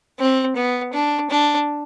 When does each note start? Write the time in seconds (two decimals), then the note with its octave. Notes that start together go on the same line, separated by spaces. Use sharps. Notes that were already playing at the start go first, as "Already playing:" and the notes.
0.19 C4
0.56 B3
0.93 D4
1.30 D4